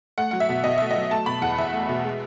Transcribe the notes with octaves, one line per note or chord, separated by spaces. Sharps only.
A3 F#5
F#3 F#5
E5
B2
B2 D#5
A3 E5
F#3 D#5
A3 A5
B2 B5
E2 F#5
E2 E5
A3
B2
G#3